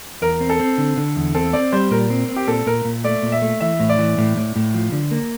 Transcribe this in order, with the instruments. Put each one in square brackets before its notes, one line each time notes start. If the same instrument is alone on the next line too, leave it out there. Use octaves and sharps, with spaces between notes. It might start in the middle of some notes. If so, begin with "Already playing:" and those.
[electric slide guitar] E2 [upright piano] A#4
[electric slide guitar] C4
[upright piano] A4
[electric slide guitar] C4
D3
D3
E2
[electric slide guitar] C4 [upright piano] A4
[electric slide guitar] C4 [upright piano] D5
[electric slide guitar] G3 [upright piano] C5
[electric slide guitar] A#2 [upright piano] A#4
[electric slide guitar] C4
C4
[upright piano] G4
[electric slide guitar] A#2 [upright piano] A4
[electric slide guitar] A#2 [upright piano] A#4
[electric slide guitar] A#2
[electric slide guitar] A3 [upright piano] D5
[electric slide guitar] A#2
[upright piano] E5
[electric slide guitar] A3
[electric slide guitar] E3 [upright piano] E5
[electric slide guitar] A2
[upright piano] D5
[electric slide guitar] E3
A2
A2
A2
F3
D3
A#3